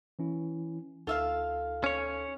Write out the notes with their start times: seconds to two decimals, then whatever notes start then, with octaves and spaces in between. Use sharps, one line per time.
0.19 E3 C#4 E4
1.07 D2 D#4 F4 A4 E5 F5
1.84 C#4 C#5